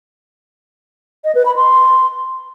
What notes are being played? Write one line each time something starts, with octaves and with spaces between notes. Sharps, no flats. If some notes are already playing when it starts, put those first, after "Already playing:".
D#5
B4
B5
C6